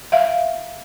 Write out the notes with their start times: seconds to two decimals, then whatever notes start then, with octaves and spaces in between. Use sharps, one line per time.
0.12 E5 F5